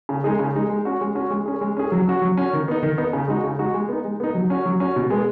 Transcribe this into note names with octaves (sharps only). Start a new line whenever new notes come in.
C#3
G#3 D#4 G#4
C#3
G#3 D#4 G#4
G#3
C#4 F#4
G#3
C#4 F#4
G#3
C#4 G#4
G#3
C#4 G#4
F#3
C#4 F#4
F#3
C#4 F#4
D#3
B3 D#4
D#3
B3 D#4
C#3
G#3 D#4 F#4
C#3
G#3 D#4 F#4
G#3
B3 D#4
G#3
B3 D#4
F#3
C#4 F#4
F#3
C#4 F#4
B2
G#3 B3 G#4